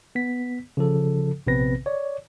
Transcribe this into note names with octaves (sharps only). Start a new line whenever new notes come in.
B3 B6
C#3 F3 A4
A#1 C3 B3 C4 B4 A#6
C#5 D5